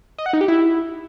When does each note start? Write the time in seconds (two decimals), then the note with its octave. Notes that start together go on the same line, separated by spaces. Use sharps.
0.18 D#5
0.26 F#5
0.33 D#4
0.41 G4
0.48 E4